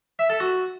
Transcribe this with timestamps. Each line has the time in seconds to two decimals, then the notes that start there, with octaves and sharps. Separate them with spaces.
0.19 E5
0.30 A4
0.40 F#4